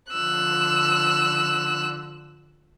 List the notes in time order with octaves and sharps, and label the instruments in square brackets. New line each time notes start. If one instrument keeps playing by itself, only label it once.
[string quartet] D3 F3 E6 F#6